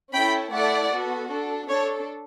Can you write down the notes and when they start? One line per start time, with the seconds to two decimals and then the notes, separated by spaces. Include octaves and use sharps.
0.13 C#4 E4 A4 G5 B5
0.52 A3 E4 A4 D5 F#5
0.92 B3 F#4 A4
1.30 D4 A4
1.69 D4 A4 C#5